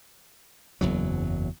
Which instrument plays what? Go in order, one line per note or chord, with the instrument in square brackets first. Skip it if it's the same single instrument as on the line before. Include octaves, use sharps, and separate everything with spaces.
[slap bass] F#1 E2 F#3